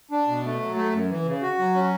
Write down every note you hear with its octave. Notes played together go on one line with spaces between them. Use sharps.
D4
B2
A3
F#3
A3
F#2
E3
C#3
F#4
F#3
C#4